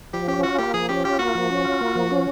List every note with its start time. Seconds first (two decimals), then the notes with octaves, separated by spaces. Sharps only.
0.13 F3 G4
0.28 C#4 G4
0.43 F4 F#4
0.58 A#3 G4
0.74 F3 G#4
0.89 C#4 G4
1.04 F4 G4
1.19 A#3 F#4
1.35 F3
1.50 C#4
1.65 F4
1.81 A#3
1.95 F3
2.11 C#4